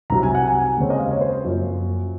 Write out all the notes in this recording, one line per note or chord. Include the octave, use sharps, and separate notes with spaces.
C2 C3 F#3 A#5
G#5
F#5
G#5
D#2 C#3 G#3 C4 C#5
D#5
F5
C#5
C5
F#2 F3 A#3 F4